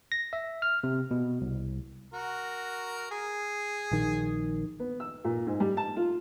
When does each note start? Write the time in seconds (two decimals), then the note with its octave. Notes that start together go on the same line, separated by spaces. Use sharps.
0.12 A#6
0.33 E5
0.62 F6
0.84 C3
1.11 B2
1.41 C2
2.13 F#4 A#4
3.11 G#4
3.91 A#1 D#3
4.80 B3
5.00 E6
5.25 A#2
5.47 G#2
5.60 G3
5.77 A5
5.97 F4